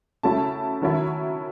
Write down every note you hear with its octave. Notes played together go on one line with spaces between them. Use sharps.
C#3 F#3 A3 C#4 E4 A5
D#3 F#3 C#4 E4